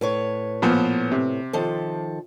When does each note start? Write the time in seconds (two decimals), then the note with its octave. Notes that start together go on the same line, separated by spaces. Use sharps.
0.01 A2 B4 C#5
0.62 A#2 F3 B3
1.12 C3
1.53 D#3 F3 A4